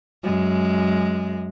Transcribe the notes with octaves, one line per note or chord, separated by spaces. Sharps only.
F#2 G#3